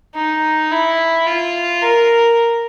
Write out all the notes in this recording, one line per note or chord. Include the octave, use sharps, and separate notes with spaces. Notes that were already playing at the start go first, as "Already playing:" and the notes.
D#4
E4
F4
A#4